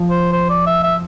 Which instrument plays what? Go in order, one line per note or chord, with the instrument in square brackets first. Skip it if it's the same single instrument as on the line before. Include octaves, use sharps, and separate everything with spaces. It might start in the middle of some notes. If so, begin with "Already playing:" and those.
Already playing: [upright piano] F3
[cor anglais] C5
C5
D5
E5
E5